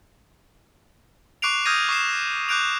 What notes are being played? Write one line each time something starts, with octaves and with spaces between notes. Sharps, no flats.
C#6 D6 F#6 C7 D7 F7
D#6 F6 G6 G#6 A#6 D#7
C#6 D#6 C7 E7
A#6
D6 F#6 G6 D7 F7